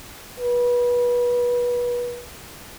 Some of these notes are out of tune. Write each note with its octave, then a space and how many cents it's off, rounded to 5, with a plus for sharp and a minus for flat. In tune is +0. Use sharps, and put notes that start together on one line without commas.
B4 -25